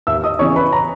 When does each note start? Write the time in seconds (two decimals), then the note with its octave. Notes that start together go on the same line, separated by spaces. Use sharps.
0.07 D#2 E5 E6
0.24 D#5 D#6
0.39 C#3 E3 C#5 C#6
0.56 B4 B5
0.73 A#5